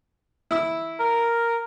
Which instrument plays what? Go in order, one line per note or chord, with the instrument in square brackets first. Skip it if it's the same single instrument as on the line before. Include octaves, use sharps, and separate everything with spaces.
[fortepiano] E4 E6
[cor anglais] A#4